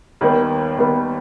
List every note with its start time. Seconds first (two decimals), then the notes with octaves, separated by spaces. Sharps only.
0.21 D#2 D#3 G3 B3
0.78 D#2 D#3 G3 B3